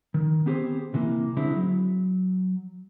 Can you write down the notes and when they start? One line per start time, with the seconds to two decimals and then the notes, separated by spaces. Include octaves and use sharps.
0.14 D#3
0.46 B3 C4 G4 G#4 C5
0.94 C3 E3 A#3
1.37 D3 G#3 C4 E4
1.54 F#3